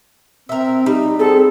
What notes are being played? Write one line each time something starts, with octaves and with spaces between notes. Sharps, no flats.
C4 A#4 E5
G3 D#4
C4 G#4 A4